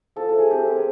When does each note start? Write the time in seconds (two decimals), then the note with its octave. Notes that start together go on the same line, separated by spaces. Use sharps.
0.16 F3 A4
0.29 A3 A4
0.39 G#4
0.50 C4 G4
0.67 C4 A#4
0.76 G#4